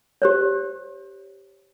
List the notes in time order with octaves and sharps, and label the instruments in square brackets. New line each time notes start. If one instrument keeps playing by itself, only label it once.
[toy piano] G4 C5 C#5